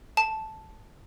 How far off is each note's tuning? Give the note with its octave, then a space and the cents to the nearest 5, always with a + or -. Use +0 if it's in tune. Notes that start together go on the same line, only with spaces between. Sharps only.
A5 -5